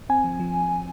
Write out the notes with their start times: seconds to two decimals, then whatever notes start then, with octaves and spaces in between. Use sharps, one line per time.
0.09 C4 G#5
0.24 F3
0.40 F3